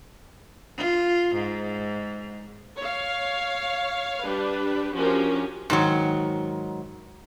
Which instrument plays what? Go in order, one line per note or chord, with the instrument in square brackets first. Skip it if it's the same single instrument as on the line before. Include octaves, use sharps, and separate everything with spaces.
[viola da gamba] F4
G#2
[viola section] C#5 F5
G3 D4 G4 B4
F3 C#4 D4 F#4 G4 A#4
[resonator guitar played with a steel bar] G#2 D#3 F#3